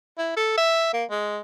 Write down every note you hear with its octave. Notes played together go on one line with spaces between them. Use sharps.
E4
A4
E5
A#3
G#3